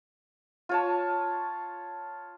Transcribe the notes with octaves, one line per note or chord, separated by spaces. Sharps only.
F4 C#5 A5